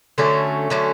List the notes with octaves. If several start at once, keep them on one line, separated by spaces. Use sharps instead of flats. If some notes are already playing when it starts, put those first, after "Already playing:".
D3 F#3 A3 C#4
D3 F#3 A3 C#4